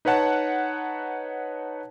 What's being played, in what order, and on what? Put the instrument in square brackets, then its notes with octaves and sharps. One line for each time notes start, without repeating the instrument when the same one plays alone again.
[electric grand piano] D#4 B4 C#5 F#5 A5